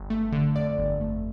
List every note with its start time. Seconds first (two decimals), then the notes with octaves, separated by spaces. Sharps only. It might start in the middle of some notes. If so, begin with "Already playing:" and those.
Already playing: G1
0.10 A3
0.32 D3
0.56 F2 D5
0.78 G1
1.01 A3